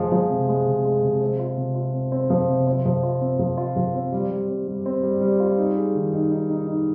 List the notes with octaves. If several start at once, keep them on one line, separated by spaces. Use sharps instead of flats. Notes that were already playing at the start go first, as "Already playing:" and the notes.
Already playing: F3 G#3
F3
C3
G#3
C3
G#3
C3
C4
F4
C3
F4
C4
C4
F3
C3
C4
F3
F4
C4
F3
F4
F3
C4
G3
G3
C4
G3
C4
G3
G3
F4
D#4
G#4
D#3
D#4
D#4
D#4
D#4